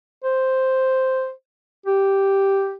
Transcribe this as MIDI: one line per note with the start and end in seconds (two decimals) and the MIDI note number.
0.24 1.31 72
1.86 2.75 67